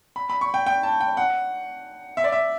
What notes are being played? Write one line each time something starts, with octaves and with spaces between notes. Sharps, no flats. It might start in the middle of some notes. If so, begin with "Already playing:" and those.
B5
B5
C#6
G5
G5
A5
G5
F#5
E5
D5
E5